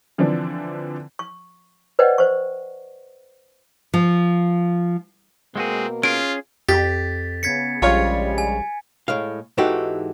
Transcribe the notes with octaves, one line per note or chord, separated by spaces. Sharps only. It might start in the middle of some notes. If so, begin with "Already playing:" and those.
D3 E3 F3 C4 D4
C#6
B4 C5 D5 D#5 F#5 G5
C5 C#6
F3
B2 G#3 A#3 C4 F#4 G#4
C#4 F4 G#4 D7
F2 G4 A6 B6
C#3 B3 G#6 B6 C#7
A#1 C#3 G3 G#3 F4 C#5
G#5
A2 G#3 F5
G#2 E3 D#4 F#4 G4 A4